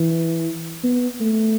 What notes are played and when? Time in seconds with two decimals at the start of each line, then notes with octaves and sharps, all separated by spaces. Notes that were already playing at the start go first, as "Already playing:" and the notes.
Already playing: E3
0.84 B3
1.20 A3